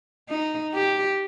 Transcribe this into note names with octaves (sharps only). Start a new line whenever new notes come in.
D#4
G4